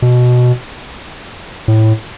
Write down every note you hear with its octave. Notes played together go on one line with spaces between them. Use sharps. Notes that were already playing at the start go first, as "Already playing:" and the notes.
B2
A2